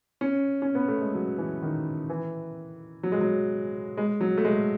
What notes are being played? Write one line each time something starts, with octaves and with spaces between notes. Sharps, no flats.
C#4
C#4
B3
A3
G#3
F#3
E3
D#3
E3
F#3
G#3
F#3
G#3
F#3
A3
G#3